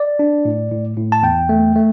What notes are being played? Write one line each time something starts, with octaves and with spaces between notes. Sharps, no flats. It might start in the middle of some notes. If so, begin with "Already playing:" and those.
Already playing: D5
D4
A2
A2
A2
A5
E2 G5
A3
A3